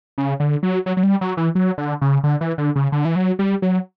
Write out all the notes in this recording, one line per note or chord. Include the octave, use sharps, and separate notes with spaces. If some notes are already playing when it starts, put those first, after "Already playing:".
C#3
D3
F#3
F#3
F#3
G3
F#3
E3
F#3
D3
C#3
D3
E3
D3
C#3
D3
E3
F#3
G3
F#3